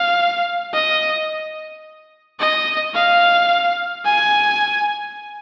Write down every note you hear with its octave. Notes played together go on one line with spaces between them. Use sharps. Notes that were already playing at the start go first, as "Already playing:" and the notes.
Already playing: F5
D#5
D#5
F5
G#5